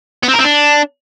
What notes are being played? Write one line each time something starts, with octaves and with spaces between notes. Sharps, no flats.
B3
C4
A#4
C4
D4